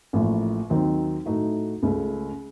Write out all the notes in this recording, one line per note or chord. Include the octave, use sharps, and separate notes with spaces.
A1 A2 F3 A#3
D#2 D#3 F#3 C4 D#4
A2 A3 D#4 F#4
C#2 C#3 A3